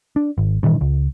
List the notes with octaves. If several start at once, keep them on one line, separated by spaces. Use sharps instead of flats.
D4
G#1
G2 A#2 D#3 E3
C#2